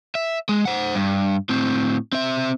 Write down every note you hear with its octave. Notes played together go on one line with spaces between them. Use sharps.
E5
G#3
C5 F#5
G2
A2 C4
C4 E5